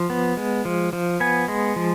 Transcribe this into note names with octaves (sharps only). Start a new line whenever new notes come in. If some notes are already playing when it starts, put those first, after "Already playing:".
Already playing: F3
B3
G#3
F3
F3
B3 G#5
G#3
F3